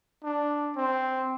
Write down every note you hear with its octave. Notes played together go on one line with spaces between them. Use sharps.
D4
C4